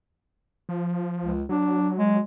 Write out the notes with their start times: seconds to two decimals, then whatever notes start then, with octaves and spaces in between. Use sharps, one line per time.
0.69 F3
1.22 C#2
1.49 F#3 D4
1.98 G#3